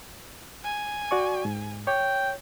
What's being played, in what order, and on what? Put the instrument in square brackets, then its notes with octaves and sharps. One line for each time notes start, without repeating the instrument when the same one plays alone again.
[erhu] G#5
[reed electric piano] F#4 D5 C#6
G#2
[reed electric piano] C#5 [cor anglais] G5